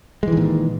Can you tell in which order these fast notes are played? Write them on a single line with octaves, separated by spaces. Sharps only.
G#3 E3 D#3 A#2